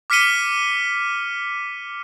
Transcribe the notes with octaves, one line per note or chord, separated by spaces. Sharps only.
D6 F6 B6 C#7 D#7 G7